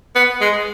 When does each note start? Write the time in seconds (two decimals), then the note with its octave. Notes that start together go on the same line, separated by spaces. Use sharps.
0.16 B3
0.41 G#3